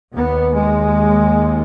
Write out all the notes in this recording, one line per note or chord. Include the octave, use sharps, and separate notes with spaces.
D#2 B3
G#3